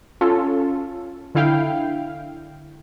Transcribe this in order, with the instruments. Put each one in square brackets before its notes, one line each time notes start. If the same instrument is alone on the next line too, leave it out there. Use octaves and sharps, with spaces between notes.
[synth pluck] C#4 F4 A4
D3 E4 F5 G5